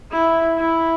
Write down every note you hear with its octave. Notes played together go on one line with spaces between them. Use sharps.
E4
E4